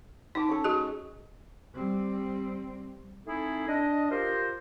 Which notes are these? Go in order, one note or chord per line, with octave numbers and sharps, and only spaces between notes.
D#4 A5 D6
C#4 A4
G#3 F#4 G#4
G3 C4
A3 C4 D#4 E4 G#4 A4
D4 D#5
F4 G4 A#4 C5